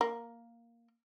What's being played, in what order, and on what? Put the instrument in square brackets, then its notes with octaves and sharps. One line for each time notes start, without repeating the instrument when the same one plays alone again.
[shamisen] A#3